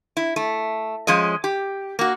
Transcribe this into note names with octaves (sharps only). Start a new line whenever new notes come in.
E4
A3
F3 G#3 C#4 D#5
G4
A#3 F#4